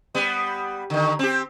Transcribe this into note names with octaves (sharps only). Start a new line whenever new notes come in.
G3 B3
D3 D#3
C4 G4